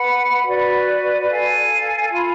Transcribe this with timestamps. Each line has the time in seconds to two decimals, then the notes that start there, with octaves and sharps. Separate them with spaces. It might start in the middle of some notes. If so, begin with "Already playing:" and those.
Already playing: B4 F#5 B5
0.47 F#4 B4 D5
1.29 A4 F5 G#5
2.11 F4 A4 F5 B5